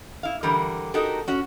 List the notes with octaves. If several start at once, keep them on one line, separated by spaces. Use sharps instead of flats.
E4 F5
D3 E3 G3 A#4
D#4 F#4 G4 A4 A#4
C#4 F#4